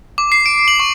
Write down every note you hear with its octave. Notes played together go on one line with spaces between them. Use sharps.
D6
C7
D7
F#7
C#6